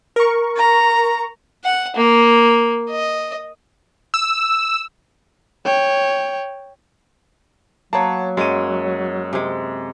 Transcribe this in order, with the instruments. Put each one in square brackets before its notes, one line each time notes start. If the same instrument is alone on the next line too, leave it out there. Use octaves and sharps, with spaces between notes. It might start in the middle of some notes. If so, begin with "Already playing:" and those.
[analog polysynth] A#4 C#6
[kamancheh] A#5
[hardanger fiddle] F#5
A#3
D#5
[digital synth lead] E6
[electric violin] C#5 G5
[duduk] F#3 [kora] A#3 B3 [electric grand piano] C#5 A5
[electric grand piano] F#2 D#7 [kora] G#3 C#5
[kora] C3 G#3